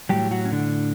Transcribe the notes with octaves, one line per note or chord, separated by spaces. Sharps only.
A2 F#3 G3 G4
F#3 F#4
C#4
D3 D4